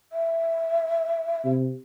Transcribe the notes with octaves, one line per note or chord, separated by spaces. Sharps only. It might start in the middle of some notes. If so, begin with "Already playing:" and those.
E5
C3